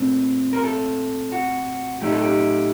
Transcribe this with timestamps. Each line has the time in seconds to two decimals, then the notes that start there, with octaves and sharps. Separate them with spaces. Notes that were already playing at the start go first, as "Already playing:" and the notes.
Already playing: A#2 A3 C4
0.53 A#4
0.63 A4
1.32 F#4
2.01 A2 F#3 A3 D#4 G4
2.12 A4
2.22 G4